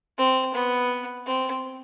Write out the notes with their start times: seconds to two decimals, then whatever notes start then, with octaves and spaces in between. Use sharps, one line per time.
0.18 C4
0.54 B3
1.26 C4